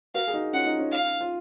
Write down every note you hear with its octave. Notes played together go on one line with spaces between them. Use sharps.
F#4 A#4 F5
G#4
D#4 F#4
C#4 F4 F#5
D#4
C#4
F5
F4